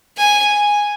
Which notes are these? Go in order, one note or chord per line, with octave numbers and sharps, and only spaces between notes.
G#5